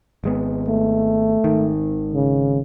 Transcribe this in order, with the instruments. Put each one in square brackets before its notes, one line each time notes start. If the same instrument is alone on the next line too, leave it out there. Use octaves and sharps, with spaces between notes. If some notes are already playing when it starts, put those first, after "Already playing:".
[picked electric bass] G#1 G#3 B3
[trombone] A3
[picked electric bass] G#1 D#3
[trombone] C#3